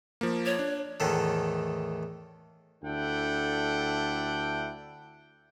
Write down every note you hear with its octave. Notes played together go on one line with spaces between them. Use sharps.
F3 A#3
C#5
D4
E2 A2 D#3 A3
D2 D4 E4 A4 F#5 G5